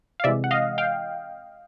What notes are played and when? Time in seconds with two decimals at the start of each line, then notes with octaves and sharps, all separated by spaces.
0.20 F5
0.24 C3 E3 G#3 D5 E5
0.44 F#5
0.51 D#5 F5
0.78 F5 G5